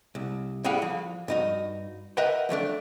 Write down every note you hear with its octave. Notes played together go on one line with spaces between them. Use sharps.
C2
A2 G3 G#4 F5 F#5
F3
G2 D#4 F#4
A#4 B4 D#5 E5 F#5 G5
F3 F#3 A3 D4